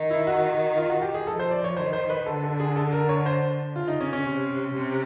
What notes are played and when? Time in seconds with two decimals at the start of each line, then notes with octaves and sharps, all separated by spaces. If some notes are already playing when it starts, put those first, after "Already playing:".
Already playing: D#3
0.10 E4
0.27 F#4
0.52 F#4
0.77 F4
0.90 F#4
1.02 G4
1.14 G#4
1.26 F3 A4
1.39 C5
1.51 D5
1.64 C#5
1.77 D#3 C5
1.93 C5
2.10 B4
2.26 D3 A4
2.43 A4
2.60 G#4
2.76 A4
2.92 A#4
3.09 C#5
3.26 C5
3.76 C#3 F4
3.88 D#4
4.01 C#4
4.13 C#4
4.25 C3
4.75 C3